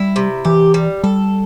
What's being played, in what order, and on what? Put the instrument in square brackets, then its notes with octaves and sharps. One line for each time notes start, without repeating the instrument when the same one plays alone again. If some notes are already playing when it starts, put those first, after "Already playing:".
Already playing: [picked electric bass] G3 [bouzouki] E4
[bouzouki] C3
[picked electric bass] E3 [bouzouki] G4
[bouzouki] G3
[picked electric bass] G3 [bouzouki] A4